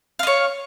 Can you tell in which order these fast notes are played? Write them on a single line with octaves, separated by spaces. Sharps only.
F5 D#5 C#5